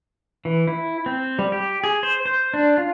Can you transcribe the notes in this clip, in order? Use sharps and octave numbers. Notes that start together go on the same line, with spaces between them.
E3
E4
C4
G3
G4
G#4
C5
C5
D4
F4